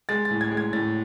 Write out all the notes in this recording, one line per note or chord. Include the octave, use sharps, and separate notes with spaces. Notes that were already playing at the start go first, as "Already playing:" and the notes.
G#3 A6
A6
A2
G#6
G#3
G#6
A2 A6